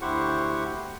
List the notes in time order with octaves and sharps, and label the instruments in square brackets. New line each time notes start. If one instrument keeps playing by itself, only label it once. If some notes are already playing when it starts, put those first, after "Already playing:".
[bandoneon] D2 E4 G4 C5 F#5 C#6